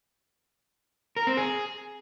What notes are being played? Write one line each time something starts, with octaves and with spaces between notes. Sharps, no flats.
A#4
C4
G#4